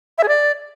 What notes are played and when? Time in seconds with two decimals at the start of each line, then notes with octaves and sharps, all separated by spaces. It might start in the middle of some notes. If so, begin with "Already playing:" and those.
0.18 E5
0.23 G#4
0.28 D5